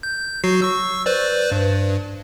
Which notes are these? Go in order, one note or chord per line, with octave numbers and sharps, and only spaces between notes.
G6
F#3 F#4 C7
C#6 E6
B4 C5 D5
G2